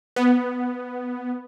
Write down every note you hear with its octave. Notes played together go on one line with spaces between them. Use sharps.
B3